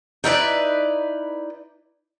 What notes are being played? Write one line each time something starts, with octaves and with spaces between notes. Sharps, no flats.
D#4 E4 B4 D5